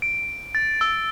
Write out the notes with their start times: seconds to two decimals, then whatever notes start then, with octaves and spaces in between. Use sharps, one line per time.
0.02 D7
0.55 A6
0.81 E6